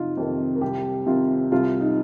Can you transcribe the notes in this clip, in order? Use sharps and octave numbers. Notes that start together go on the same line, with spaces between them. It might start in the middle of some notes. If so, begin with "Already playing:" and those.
Already playing: F1 D#4 F4
F2 C3 D#3
A#4
C2 G4
C3 D#3 F4
C2 F4
D#4